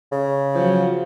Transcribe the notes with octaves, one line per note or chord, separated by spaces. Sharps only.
C#3
F3 F#3